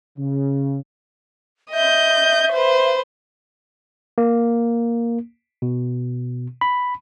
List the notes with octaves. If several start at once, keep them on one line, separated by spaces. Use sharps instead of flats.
C#3
D#5 E5 G6
B4 C5
A#3
B2
B5